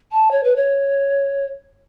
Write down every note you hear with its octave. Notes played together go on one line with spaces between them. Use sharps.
A5
C#5
B4
C#5